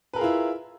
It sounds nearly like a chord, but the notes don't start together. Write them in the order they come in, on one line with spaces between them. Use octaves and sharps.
B4 A#4 G#4 F4 E4